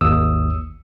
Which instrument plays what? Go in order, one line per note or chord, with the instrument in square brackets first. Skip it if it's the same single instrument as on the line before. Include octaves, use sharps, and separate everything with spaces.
[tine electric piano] G#1 D#2 D#6 E6